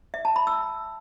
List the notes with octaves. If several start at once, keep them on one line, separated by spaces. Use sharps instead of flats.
E5
A5
B5
E6